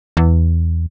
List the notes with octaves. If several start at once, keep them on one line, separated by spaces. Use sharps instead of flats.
E2